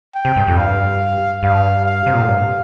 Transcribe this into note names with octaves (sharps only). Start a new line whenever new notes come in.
G5
C3
G2
F2
G2 F5
G2 F5
F5
C3
A#2
A2
G2